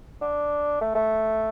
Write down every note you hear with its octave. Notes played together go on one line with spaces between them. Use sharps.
D4
A3
A3